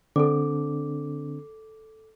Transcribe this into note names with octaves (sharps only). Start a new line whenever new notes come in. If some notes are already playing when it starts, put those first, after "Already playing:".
D3 C4 D4 A4 D6